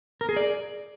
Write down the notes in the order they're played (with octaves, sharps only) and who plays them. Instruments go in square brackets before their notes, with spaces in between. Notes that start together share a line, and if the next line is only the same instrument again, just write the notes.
[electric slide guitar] A#4
G#4
D5